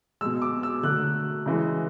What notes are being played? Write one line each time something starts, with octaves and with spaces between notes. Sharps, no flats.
B2 G#3 E6
D6
E6
D3 F#3 A3 F#6
C#3 E3 G#3